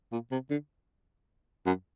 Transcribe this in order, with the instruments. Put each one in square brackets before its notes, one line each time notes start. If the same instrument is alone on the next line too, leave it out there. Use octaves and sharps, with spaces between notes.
[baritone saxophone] A#2
C3
D3
F#2